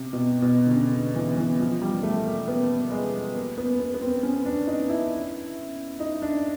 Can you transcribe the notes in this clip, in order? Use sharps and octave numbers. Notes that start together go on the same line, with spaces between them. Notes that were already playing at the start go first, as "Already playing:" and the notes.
Already playing: C3
B2
B2
D3
C#3
D3
E3
E3
F3
G3
A3
A#3
B3
G#3
A#3
B3
B3
B3
C4
C#4
D4
D#4
E4
D#4
D4